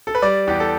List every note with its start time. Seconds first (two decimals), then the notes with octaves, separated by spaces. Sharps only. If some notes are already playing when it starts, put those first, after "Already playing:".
0.07 A4
0.15 B4
0.22 G3 D5
0.47 E2 G4
0.60 A4